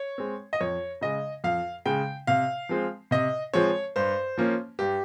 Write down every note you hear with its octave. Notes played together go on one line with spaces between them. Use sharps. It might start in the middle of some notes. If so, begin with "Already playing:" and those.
Already playing: C#5
G#3 C4
D#5
F2 C#5
C#3 G#3 D#5
F2 F5
C#3 G#3 G5
C3 F5
F3 G#3 C4
C3 D#5
F3 G#3 C4 C#5
G2 C5
F3 A#3 C#4
G2 G4